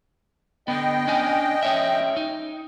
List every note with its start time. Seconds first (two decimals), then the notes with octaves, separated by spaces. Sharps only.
0.68 D3 B3 D#5 G5
1.07 C#4 D4 G#5
1.63 C#4 C#5 E5
2.17 D#4